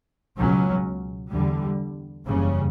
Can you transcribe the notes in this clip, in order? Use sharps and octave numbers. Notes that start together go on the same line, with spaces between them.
C#2 B2 F#3 C#4
E2 D3 G3
F#1 E2 C#3 G3 C#4